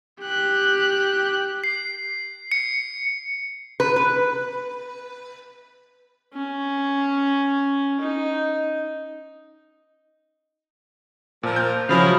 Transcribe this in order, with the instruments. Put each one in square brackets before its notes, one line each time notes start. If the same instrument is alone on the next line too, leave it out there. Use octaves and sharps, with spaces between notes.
[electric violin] G4 F#6
[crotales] C7
C#7
[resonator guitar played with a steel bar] B4
B4
[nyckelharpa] C#4
D#4
[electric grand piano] A#2 [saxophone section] F3 A#4
[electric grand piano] F6 G6
[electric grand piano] C#3 F3 F#3 [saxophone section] E4 D#5 F5